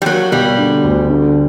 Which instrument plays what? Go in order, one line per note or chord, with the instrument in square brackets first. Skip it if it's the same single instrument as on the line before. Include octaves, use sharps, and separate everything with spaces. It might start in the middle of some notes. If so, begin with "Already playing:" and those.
[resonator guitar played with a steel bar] G3
[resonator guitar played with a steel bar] F#3 [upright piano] A#3
[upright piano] B2 [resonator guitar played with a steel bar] G3
[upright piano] D3
D2
D3